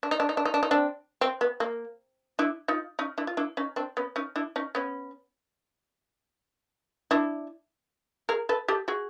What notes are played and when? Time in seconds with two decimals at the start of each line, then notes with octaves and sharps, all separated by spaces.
0.03 D4
0.11 D#4
0.20 D4
0.29 D#4
0.37 D4
0.45 D#4
0.54 D4
0.63 D#4
0.71 C4 D4
1.21 C4
1.41 B3
1.60 A#3
2.39 D4 E4
2.68 D#4 F4
2.99 C#4 D#4
3.18 D4 E4
3.27 F4
3.37 D4 E4
3.57 C#4 D#4
3.76 C4 D4
3.97 B3 C#4
4.16 C#4 D#4
4.36 D4 E4
4.56 C#4 D#4
4.75 B3 C#4
7.11 D4 E4
8.29 G#4 A#4
8.49 A4 B4
8.68 G4 A4
8.88 F#4 G#4